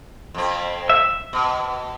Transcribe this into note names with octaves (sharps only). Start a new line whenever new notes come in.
F2 C4
E5
B2